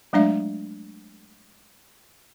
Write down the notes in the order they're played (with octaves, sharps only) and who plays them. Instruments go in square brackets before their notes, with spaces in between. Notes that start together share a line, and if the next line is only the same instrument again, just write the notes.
[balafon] F#3 G#3 A3 D4 D5 E5